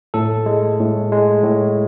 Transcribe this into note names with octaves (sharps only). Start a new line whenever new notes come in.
A2 A4
G#3
A2
G#3
A2